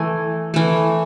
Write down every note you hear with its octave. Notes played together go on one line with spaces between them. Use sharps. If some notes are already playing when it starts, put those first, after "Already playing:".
Already playing: E3 A3 G#5
E3 A3